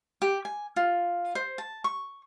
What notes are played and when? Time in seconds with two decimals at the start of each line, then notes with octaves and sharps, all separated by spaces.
0.22 G4
0.45 G#5
0.76 F4
1.35 C5
1.58 A5
1.84 C#6